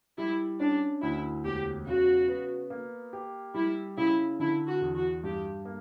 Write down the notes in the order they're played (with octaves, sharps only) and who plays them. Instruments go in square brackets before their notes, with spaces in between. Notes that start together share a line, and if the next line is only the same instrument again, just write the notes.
[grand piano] G3 [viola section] E4
[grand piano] C#4 [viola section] D4
[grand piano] D2 [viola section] E4
[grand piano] E1 [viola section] G4
[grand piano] C#3 [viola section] F#4
[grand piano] B3
A#3
G4
[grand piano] G3 [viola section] E4
[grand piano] C#3 [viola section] E4
[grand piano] D3 [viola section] E4
[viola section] F#4
[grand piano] E2
[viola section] F#4
[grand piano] G2 [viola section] G4
[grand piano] A#3